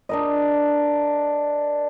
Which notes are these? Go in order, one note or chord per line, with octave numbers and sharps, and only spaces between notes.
D4 A#4 D#5